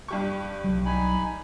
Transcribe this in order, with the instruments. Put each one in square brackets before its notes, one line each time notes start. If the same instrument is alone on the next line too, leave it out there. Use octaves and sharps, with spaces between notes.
[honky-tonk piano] G2 G4 C#6
[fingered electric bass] B1 F#3
[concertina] D#4 G#5 B5